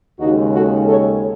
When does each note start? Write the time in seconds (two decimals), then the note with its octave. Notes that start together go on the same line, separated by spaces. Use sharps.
0.20 D#2 C#3 G#3 D#4 F#4
0.53 F#4 A4
0.87 A4 C#5